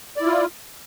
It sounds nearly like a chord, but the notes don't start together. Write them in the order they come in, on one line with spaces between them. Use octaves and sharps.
D5 E4 F4